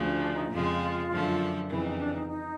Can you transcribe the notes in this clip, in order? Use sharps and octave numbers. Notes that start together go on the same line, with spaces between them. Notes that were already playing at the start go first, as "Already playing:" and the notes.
Already playing: D2 C#3 F3
C#4
D4
D#4
F2 C#3 F3 G#3 F4
F#2 D3 F3 A3
F2 C#3 E3 E4
D#4
D4
D#4
D#4